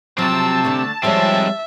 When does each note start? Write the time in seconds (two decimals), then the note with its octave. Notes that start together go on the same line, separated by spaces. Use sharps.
0.18 C3 F3 F#3 C4 A5 E6
0.64 D3 A3
1.03 F3 G3 G#3 C4 C#5 E5